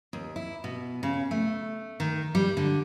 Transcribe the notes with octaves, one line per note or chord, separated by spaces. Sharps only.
D#2
E4
B2
C#3
A3
D#3
G3
D3